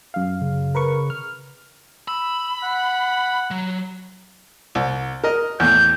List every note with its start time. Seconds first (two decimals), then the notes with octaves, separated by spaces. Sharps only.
0.14 F#2 F5
0.41 C#3
0.75 A#4 B4 C#6
1.10 F6
2.08 B5 E6
2.63 F#5
3.51 F#3
4.75 C2
5.24 A#4 D#5
5.60 E2 A2 G6